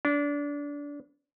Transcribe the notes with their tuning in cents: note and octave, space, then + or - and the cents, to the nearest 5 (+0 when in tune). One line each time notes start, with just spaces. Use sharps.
D4 -25